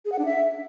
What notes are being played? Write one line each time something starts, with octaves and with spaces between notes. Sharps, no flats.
G#4
F#5
D4
E5